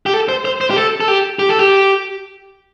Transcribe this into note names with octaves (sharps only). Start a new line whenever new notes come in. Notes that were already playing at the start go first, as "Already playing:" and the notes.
G4
A4
C5
C5
C5
G4
A4
A4
G4
G4
A4
G4